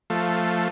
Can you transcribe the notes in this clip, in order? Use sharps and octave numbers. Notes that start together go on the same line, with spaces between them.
F3 A3